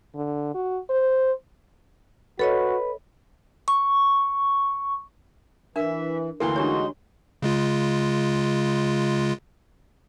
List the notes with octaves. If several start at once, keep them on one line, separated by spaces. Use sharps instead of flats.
D3
F#4
C5
F#4 A4 B4 C#5 D#5
C#6
E3 D4 A#4 E5
D2 E3 A#3 A4 G5 C6
G#3 D4 D#4 F#4 G4 C#5
C#3 G#3 F4